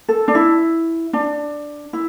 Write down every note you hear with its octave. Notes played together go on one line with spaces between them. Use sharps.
A4
D4
E4
D4
E4